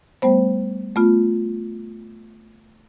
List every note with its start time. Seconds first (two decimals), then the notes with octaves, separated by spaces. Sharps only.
0.22 G3 A3 B3 C5
0.96 A3 B3 F4